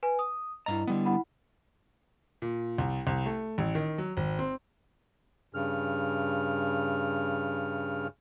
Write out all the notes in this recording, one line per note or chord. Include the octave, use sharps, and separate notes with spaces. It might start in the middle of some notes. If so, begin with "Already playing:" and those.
B4 G#5
D#6
G2 E4 D#5 A#5
D3 G3 B3
E4 F#5 B5
A#2
C2
C2
A3
A1
D#3
F#3
G#1
C4
G2 C#3 F6